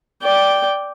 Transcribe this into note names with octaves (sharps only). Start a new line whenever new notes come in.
D5 G5